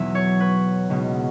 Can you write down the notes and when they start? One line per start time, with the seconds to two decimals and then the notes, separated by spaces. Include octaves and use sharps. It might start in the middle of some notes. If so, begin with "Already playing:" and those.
Already playing: E2 B2 F#3 B3 E5
0.15 C#5
0.40 B4
0.90 C#2 B2 B3